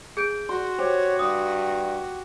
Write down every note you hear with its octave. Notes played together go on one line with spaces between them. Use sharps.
G#4 G6 D7
F#4 C6
G4 C5 C#5
G2 D#6